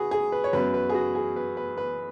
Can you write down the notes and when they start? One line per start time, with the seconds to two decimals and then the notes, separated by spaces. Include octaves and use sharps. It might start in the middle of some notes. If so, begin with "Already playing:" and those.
Already playing: F#4 G#4 B4
0.11 G#4
0.32 B4
0.44 C#5
0.53 F#2 F#3 B3 B4
0.74 B4
0.89 G#4
0.94 F#4
1.15 G#4
1.36 B4
1.57 B4
1.77 B4